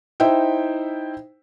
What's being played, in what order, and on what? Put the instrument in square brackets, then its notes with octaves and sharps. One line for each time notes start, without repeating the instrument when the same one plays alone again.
[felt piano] D#4 E4 C5 E5 G5